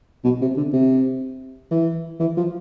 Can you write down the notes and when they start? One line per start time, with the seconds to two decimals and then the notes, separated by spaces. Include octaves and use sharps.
0.24 B2
0.41 C3
0.57 D3
0.73 C3
1.71 E3
2.20 E3
2.37 F3